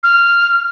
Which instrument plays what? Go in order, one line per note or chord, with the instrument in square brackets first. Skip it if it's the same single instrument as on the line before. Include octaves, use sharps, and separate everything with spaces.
[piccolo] F6